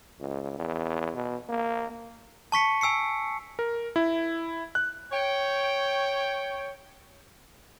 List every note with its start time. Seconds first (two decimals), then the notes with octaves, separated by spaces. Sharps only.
0.20 C#2
0.59 E2
1.15 B2
1.49 A#3
2.52 A5 C#6 B6 C#7
2.81 G#5 E6 C7 C#7
3.59 A#4
3.96 E4
4.75 F#6
5.12 C#5 G5